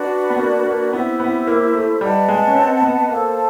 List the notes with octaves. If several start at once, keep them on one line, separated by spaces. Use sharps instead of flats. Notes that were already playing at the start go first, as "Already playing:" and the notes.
Already playing: D4 F#4 B4 D5
B3
A#3
A#3
B3 E4 G4 C5 E5
B3
A#3
A3
G3 B4 D#5 F#5 A5
G#3
C#4
C4
B3
A#3 A4 C5 F5 A5